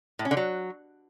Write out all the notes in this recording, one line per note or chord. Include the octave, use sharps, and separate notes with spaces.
A2
C#4
D3
F#3